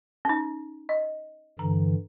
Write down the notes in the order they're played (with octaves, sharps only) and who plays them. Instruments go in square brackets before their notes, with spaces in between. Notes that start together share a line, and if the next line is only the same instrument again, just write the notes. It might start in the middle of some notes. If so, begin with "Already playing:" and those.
[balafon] C#4 D#4
D#5
[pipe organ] G2 D3 E3 [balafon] A#5